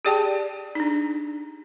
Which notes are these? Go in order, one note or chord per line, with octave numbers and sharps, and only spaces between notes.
G4 G#4 D5 G5 A5
D4 D#4